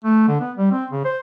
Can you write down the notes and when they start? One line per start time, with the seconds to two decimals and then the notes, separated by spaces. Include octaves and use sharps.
0.04 A3
0.28 D3
0.41 B3
0.57 G3
0.71 C4
0.91 C#3
1.05 C5